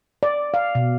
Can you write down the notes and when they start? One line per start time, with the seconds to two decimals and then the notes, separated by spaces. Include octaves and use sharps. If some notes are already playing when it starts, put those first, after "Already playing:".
0.23 D5
0.54 F5
0.75 B2